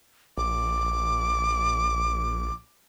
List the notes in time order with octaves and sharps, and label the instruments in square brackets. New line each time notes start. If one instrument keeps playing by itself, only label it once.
[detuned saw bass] A#1 [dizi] D6